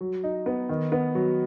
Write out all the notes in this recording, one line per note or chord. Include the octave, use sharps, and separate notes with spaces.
F#3
D#4
B3
D#3
B3
F#3